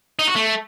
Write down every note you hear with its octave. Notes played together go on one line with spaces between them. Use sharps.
D#4
F#4
A3